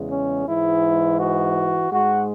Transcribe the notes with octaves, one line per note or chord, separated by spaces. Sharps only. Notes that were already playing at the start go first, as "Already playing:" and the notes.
Already playing: E2 C#3 G#3
C#4
G#2 E3 G#3 E4
F#4
G#2 G#3 F#4